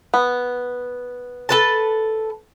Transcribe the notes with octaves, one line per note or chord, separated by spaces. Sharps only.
B3
A4 B4 A5